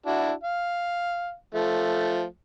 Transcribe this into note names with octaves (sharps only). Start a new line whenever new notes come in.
D4 E4 F#4
F5
F3 A3